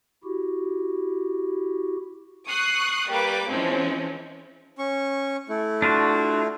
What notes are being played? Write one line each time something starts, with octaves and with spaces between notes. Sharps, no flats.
E4 F#4 G4
C#6 D#6 F#6 C7
G3 A#3 B4 D6
E3 F3 G#3 C4 C#4
C#4 C#6
A3 E4
D4 F4 F#4